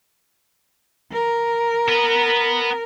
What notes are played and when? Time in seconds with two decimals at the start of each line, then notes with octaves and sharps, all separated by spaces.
1.12 A#4
1.88 B3 B4